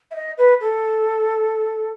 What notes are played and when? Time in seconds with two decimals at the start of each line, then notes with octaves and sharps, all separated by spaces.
0.11 E5
0.15 D#5
0.38 B4
0.61 A4